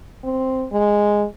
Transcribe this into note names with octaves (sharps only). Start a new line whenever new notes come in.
C4
G#3